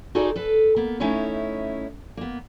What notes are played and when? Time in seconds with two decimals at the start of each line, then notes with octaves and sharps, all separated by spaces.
0.15 D#4 F#4 G#4 A4 C5 D5
0.35 A4 B4
0.76 A#3 B3
1.00 A3 C#4 D#4 E4 C#5
2.17 A#3 B3